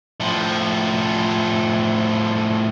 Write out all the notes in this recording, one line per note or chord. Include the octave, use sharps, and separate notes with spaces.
A2 F3